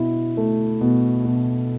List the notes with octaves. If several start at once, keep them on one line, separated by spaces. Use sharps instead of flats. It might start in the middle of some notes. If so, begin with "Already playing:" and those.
Already playing: B2 E4
A3
B2
B2